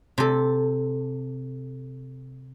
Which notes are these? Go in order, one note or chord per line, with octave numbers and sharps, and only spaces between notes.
C3 A4